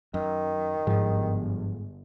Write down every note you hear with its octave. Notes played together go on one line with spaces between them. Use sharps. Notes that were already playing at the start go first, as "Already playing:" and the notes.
F#2 D#3
G1 G#2 F3